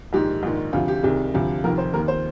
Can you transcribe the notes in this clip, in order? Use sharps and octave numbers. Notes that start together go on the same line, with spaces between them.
A#1 G#2 D#3 G4
A#1 G#2 D#3
D2 C3 F3 F4
G4
C2 C3 D#3 G#4
D2 C3 F3
F1 F2 D#3 A#4
C5
D#2 D#3 A#4
C5